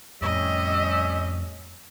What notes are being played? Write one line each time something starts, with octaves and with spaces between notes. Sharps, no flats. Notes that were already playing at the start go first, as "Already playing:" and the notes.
F2 A2 G3 C#4 D#5 E5